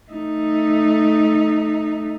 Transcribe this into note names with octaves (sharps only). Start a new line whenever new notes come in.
A3 D#4